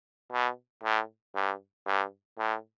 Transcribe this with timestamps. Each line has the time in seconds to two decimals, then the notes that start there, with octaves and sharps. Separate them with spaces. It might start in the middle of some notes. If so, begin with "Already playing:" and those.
0.32 B2
0.84 A2
1.36 G2
1.87 G2
2.38 A2